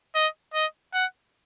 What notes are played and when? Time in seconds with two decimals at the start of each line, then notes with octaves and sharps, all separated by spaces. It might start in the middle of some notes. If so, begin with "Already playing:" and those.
0.15 D#5
0.54 D#5
0.94 F#5